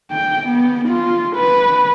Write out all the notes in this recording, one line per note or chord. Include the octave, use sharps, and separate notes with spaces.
G5
B3
F4
B4